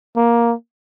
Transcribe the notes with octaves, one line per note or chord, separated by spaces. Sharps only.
A#3